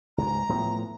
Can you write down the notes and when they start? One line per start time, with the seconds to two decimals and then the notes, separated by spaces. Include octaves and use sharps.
0.18 C#2 G#2 A#5
0.49 A2 F3 B3